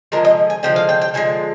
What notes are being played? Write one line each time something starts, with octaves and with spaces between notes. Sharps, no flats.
D3 F3 G#3 A#4
D#5
G#5
D3 F3 G#3 G5
F5
G5
G5
D3 F3 G#3 G#5